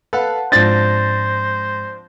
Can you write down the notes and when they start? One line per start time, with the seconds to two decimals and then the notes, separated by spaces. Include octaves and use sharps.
0.13 A4 B4 F5 F#5 A5
0.52 G#2 F3 C4 D4 C5 A6 A#6